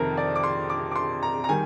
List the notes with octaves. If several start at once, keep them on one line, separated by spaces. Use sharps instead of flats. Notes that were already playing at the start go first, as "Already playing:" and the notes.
Already playing: F2 C3 D#3 A#4
D5
D6
C6
D6
D6
C6
A#5
A#5
D#3 G3 G#5